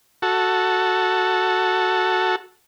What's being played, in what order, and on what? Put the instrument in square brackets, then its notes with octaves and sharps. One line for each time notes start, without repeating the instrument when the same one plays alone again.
[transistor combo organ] F#4 A4